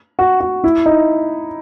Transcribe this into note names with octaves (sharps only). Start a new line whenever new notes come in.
F#4
F#4
E4
D#4